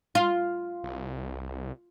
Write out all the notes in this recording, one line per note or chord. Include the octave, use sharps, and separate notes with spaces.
F4
C2